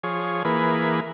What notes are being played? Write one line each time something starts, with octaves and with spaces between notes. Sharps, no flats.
F3 G#4 C#5
E3 A#3 G#4 B4